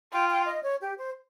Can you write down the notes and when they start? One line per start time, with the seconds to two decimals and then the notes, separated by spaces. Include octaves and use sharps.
0.12 F4 G5
0.30 G5
0.47 D#5
0.64 C#5
0.81 G4
0.98 C5